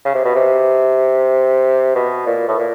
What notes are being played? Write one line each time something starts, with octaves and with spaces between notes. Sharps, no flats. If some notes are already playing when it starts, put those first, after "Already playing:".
C#3
C3
B2
C3
B2
A#2
A2
A#2